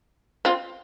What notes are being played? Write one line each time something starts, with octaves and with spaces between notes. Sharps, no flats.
C4 F4